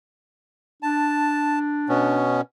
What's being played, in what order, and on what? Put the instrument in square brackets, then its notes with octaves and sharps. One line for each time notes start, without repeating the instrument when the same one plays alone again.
[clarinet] D4 [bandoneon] A5
[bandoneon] B2 B3 C#4